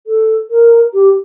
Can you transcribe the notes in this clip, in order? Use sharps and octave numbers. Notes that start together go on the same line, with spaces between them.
A4
A#4
G4